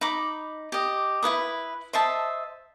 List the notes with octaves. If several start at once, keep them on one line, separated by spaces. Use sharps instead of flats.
D#4 B5 D6
G4 D#5
E4 F4 B4 D#6
C5 D#5 E5 A5